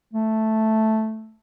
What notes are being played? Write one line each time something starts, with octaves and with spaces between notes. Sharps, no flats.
A3